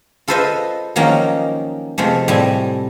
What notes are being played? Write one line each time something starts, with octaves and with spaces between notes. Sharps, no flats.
F4 A4 B4 C5 D#5 E5
D#3 F3 F#3 A#3 C#4 D#4
C3 F3 G#3 A3
A2 G3 C4 G#5